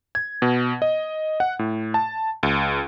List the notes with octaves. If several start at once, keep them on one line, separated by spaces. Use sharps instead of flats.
G#6
B2
D#5
F#5
A2
A5
C#2